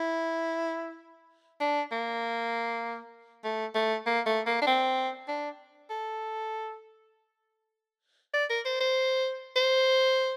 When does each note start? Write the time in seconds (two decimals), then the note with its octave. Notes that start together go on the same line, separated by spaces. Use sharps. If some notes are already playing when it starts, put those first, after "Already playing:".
Already playing: E4
1.60 D4
1.92 A#3
3.44 A3
3.75 A3
4.06 A#3
4.26 A3
4.46 A#3
4.61 D4
4.67 C4
5.28 D4
5.90 A4
8.34 D5
8.50 A#4
8.65 C5
8.80 C5
9.56 C5